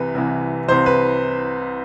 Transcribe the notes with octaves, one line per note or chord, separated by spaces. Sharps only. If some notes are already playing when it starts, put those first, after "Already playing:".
Already playing: C2 C3 E3 B4
C2 C3 E3
C2 C3 E3 C5
B4